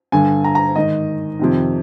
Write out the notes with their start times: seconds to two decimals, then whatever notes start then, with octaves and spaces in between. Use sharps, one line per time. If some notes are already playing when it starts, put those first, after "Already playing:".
0.12 G2 D3 G#5
0.44 A#5
0.55 A#5
0.76 G#2 D#3 D#5
1.39 F2 C3 D#3